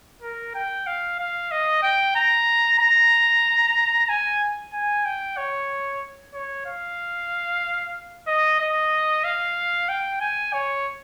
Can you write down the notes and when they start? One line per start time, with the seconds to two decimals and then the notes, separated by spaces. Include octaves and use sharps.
0.22 A#4
0.55 G5
0.87 F5
1.19 F5
1.51 D#5
1.83 G5
2.16 A#5
2.79 A#5
4.09 G#5
4.73 G#5
5.05 G5
5.37 C#5
6.34 C#5
6.66 F5
8.27 D#5
8.60 D#5
9.24 F5
9.89 G5
10.21 G#5
10.53 C#5